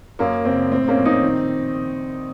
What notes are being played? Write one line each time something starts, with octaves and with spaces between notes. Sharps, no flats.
F#2 A#3 C#4
F#1 C4
A2 C4
A#3 C#4
A#1
C4 D#4
D#3